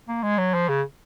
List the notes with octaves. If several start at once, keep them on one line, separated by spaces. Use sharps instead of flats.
A#3
G#3
F#3
F3
C#3